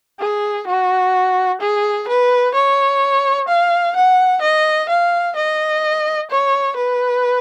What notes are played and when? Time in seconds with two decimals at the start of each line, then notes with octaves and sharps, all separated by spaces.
0.19 G#4
0.67 F#4
1.61 G#4
2.08 B4
2.54 C#5
3.48 F5
3.96 F#5
4.42 D#5
4.89 F5
5.35 D#5
6.30 C#5
6.76 B4